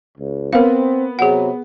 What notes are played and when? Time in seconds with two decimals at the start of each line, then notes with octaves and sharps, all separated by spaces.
0.18 C#2
0.53 B3 C4 A#4 F5
1.19 C3 F#3 G#4 F#5